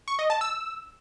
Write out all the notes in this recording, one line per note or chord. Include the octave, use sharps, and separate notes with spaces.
C#6
D#5
A5
E6